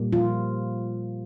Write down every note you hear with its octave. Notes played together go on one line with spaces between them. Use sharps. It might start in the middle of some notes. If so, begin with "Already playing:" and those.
Already playing: A#2 G3 A#3
F3 F4